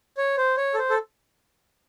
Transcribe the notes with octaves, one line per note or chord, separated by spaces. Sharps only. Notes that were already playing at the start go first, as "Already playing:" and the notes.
C#5
C5
C#5
A4
C5
A4